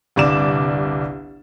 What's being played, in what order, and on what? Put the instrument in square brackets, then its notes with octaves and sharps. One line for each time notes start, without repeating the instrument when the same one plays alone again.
[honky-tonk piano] G1 C2 D5 D6 E7